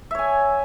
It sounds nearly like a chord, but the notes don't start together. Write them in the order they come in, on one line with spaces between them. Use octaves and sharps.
E5 C#5 G#5